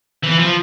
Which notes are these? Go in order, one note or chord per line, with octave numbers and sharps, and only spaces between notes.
E3
F3